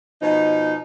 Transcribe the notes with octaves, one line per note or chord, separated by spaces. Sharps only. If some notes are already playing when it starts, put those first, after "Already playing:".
B2 F3 D#4